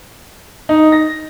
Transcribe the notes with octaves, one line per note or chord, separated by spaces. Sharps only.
D#4
A#6